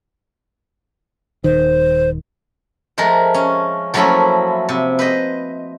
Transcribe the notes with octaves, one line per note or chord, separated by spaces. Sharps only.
D#1 D#3 C5
F3 G#3 A3 A#4
C#4
F3 F#3 A3 A#3 C#4 E4
C3
B4 C5 D#5